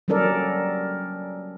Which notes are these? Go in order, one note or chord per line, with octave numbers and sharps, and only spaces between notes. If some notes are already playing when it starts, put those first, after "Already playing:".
F#3 G3 C#4 A4 A#4 D5